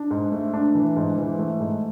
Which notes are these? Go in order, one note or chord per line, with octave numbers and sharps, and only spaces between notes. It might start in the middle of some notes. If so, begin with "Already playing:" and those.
Already playing: D4
G#2
A3
D4
E3
G#2
E3
A3
G#2